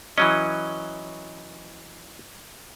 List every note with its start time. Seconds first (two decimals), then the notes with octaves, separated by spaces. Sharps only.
0.18 E3 F#3 C#4 D#5